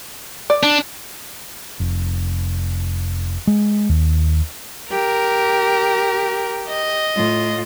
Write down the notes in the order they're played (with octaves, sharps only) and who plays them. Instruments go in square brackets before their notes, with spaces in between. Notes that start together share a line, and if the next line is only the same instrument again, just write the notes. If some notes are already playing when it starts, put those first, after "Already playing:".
[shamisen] D5
[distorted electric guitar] D4
[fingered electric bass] F1
G#3
D#2
[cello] G4 [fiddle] A#4
[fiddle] D#5
[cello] A2 F4